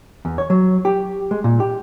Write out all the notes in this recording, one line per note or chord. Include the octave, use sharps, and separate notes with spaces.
E2
C#5
F#3
G4
G#3
A#2
G4